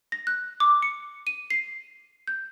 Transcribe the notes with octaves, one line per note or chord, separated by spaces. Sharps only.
A#6
F#6
D6
C#7
D#7
C7
G6